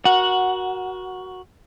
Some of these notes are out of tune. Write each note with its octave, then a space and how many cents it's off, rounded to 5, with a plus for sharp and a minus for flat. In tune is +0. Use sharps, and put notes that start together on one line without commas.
F#4 +0 A#4 +30 F#5 -5